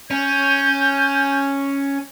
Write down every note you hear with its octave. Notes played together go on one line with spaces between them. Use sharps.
C#4 G6